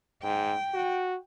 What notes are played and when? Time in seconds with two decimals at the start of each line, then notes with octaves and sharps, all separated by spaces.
0.23 G#2 G5
0.74 F#4